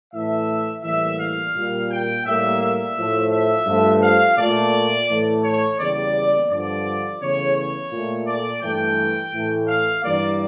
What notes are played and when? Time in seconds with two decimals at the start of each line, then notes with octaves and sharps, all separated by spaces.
0.13 A2 E3 A3 E5
0.84 A2 E3 G3 A#3 E5
1.19 F5
1.55 A#2 G3 A#3
1.91 G5
2.26 A2 G3 A#3 E5
2.61 E5
2.97 A2 F3 A3
3.32 E5
3.67 G2 F3 A3
4.03 F5
4.37 A#2 A3 D5
5.09 A2 E3 A3
5.44 C#5
5.79 E2 C#3 G3 A#3 D5
6.50 G2 D3 F3 D5
7.21 E2 C#3 E3 A3 C#5
7.56 C#5
7.92 A#2 A3
8.27 D5
8.63 G2 E3 A3 G5
9.34 A2 E3 A3
9.68 F5
10.04 G2 E3 G3 A#3 D5